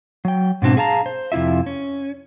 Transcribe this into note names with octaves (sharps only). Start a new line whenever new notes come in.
F#3 G5
G#2 B2 C4 D4
G#4 F5 A5 A#5
C5
F2 C3 E4 F4 E5
C#4